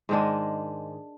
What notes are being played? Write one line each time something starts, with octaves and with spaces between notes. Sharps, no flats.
G#2 D#3 G#3 D4